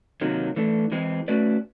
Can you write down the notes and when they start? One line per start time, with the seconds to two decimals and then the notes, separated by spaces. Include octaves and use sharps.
0.21 C3 D#3 F#3 A#3
0.56 E3 A3 D4
0.92 E3 G#3 C4
1.28 A3 C#4 F#4 B4 D5